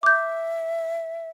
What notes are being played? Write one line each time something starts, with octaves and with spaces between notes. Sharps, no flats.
E5 D6 G6